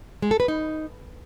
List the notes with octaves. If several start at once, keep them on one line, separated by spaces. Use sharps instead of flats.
G#3
A4
B4
D#4